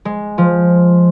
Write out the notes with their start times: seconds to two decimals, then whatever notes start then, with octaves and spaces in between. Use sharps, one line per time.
0.05 G#3
0.38 F3